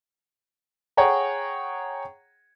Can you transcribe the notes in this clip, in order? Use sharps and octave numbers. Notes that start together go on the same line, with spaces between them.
G#4 C#5 F#5 G5 A#5